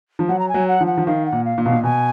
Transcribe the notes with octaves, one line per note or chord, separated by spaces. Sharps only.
F3
F#3 F#5
A#5
G#5
F#3
F#5
F3
F#5
F3
D#3 F5
F#5
A#2
F5
A#2
B2 F5
A#2
B2 G#5